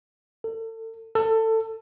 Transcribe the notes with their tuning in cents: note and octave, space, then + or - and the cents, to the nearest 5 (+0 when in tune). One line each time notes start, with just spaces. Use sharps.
A4 +35
A4 +20